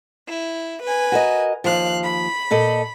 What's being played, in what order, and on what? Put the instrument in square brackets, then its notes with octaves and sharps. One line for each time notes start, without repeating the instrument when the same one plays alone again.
[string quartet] E4
B4 G#5
[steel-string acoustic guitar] F#4 A#4 D#5
[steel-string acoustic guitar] D#2 F3 [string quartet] F5 F#6
[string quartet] B5
[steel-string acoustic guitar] A#2 A4 D#5